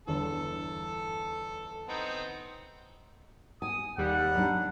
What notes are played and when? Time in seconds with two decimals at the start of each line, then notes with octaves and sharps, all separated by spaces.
0.07 G1 E2 D3 A4
1.88 B3 C4 D#4
3.62 G#5 D#6
3.98 D#2 G3 F#5
4.35 F#3 D4